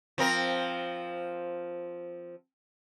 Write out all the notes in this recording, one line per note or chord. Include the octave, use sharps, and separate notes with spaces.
F3 C4 A#4